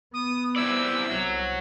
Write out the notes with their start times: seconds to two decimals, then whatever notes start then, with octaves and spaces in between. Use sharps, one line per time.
0.14 B3 D#6
0.56 C4 E4 D5 E6
1.11 C2 F#3